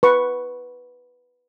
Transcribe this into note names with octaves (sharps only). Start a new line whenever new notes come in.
B4 C#6